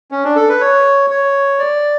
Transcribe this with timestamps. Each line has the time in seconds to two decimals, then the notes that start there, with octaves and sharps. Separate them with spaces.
0.11 C#4
0.24 D4
0.36 A4
0.49 B4
0.61 C#5
1.10 C#5
1.59 D5